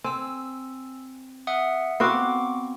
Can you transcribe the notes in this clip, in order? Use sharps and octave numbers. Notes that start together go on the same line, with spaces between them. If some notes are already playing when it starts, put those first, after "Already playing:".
C4 G#5 E6
E5 F#5 D#6
B3 C4 F#4 F5 C#6 D6